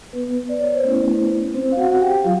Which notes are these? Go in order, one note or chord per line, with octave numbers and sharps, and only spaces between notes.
B3 B4
D5
C#5
C5
A3 B3 C#4 E4 B4
C4 C5
F5
F#4 F#5
G4 G5
F#3 F4 F5